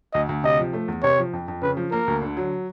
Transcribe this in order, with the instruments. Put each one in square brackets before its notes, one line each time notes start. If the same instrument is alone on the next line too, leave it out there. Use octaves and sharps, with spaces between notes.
[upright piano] D2 [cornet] D#5
[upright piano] D2
[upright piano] C3 [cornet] D#5
[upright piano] F3
A3
E2
[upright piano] C3 [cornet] C#5
[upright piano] F3
F2
F2
[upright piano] C#3 [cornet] B4
[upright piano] F3
[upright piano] A#3 [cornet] A#4
[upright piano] D2
D3
F#3